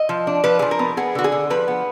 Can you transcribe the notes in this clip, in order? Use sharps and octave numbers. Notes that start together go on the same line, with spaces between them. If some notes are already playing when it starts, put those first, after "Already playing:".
Already playing: D#5
F3
D4
F3 B4
F3 G#4
A#4
B3
B3 G#4
D3 F#4
G#4
D3
F3 B4
B3